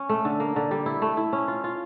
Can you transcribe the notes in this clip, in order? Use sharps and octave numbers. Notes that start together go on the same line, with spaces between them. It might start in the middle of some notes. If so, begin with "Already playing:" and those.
Already playing: C#4
A3
D3
A#3
D3
G3
E4
A3
E4
C#4
F4
F4